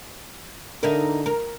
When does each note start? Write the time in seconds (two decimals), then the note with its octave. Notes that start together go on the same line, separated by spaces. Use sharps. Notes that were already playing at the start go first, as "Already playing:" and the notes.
0.83 D3 D#4 E4 A#4
1.26 A#4